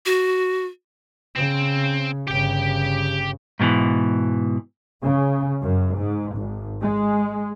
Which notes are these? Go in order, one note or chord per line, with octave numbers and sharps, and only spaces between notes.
F#4
C#3 C4
G1 C#3 G4 G5
G#2 B2 D#3 E3
C#3
F#2
G#2
G#1
G#3